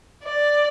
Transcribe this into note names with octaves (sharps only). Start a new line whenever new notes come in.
D5